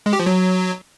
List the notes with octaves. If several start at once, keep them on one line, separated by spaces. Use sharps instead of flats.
G#3
G4
F3
F#3